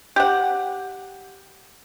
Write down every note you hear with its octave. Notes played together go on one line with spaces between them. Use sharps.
G4 F#5